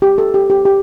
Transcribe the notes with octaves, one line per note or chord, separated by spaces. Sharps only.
G4
A4
G4
G4
G4